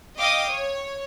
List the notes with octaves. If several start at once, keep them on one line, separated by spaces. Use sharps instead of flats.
D#5 F5 G5 D6 D#6
C#5